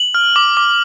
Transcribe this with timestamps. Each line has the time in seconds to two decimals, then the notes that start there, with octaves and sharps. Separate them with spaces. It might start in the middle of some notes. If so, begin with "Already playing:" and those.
Already playing: F#7
0.15 F6
0.36 D6
0.57 D6